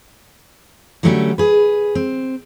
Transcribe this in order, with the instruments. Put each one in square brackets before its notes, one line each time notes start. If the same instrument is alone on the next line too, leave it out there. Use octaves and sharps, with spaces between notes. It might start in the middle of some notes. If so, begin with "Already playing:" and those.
[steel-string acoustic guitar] D3 F#3 G3 A3 C#4 G4
G#4 B4
C4